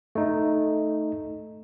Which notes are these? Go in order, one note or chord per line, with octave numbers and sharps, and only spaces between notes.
A3 D#4